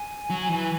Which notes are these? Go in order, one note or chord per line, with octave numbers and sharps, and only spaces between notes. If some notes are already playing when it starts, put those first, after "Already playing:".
Already playing: G#5
F#3
E3